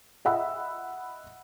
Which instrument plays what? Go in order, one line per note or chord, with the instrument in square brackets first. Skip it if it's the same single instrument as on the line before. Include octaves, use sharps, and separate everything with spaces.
[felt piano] D#5 E5 F#5 B5 E6